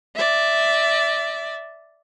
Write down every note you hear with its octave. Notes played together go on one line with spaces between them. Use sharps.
D5 E5